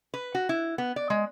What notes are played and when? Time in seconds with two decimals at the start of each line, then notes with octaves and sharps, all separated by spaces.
0.14 B4
0.35 F#4
0.49 E4
0.78 B3
0.96 D5
1.10 G#3